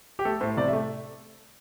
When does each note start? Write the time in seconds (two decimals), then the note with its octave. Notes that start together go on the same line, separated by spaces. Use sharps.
0.19 G4
0.25 A3 A4
0.41 A2 C5
0.57 C3 D5
0.68 E5
0.73 A3